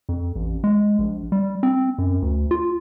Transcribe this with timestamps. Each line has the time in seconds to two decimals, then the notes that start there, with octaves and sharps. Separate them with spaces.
0.09 F2
0.36 A1
0.64 G#3
0.99 A#1
1.32 G3
1.63 C4
1.98 F#2
2.22 D2
2.51 F4